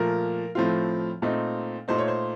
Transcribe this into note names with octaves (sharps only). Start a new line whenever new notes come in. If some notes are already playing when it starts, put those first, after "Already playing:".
Already playing: A#2 F3 A3 A#4
A2 F3 A3 C4 F4
A#2 A3 C4 D#4
A#2 A3 D#4 C5
C#5
C5